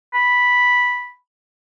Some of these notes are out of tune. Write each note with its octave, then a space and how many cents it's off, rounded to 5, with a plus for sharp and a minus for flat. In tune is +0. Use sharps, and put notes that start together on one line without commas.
B5 -5